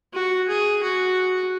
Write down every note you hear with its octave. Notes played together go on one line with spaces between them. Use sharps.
F#4
G#4
F#4